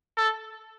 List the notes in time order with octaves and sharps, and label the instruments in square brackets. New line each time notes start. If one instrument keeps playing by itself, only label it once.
[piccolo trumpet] A4